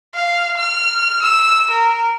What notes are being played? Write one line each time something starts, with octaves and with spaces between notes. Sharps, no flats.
F5
F6
E6
A#4